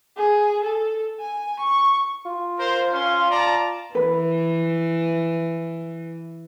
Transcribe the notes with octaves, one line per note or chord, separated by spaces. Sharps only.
G#4
A4
G#5
C#6
F4
A#4 C5
C#4 F5 C6
D5 A5 A#5
E3 B4